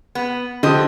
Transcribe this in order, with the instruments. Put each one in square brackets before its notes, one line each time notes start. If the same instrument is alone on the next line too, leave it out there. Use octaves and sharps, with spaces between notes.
[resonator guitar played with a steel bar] B3
[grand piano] D3 G4 [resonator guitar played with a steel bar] F3 D#5